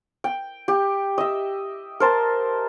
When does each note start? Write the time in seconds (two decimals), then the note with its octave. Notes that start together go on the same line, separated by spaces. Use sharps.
0.24 G5
0.68 G4
1.18 D#5 E5
2.00 A#4 C5 A5